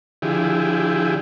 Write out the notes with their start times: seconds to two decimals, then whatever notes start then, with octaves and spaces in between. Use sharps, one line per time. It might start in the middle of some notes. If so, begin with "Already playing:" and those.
0.22 D3 F3 E4 G4 G#4